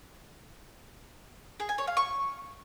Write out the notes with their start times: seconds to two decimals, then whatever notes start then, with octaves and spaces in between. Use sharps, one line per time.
1.60 G#4
1.69 G#5
1.78 C#5
1.87 F5
1.97 C#6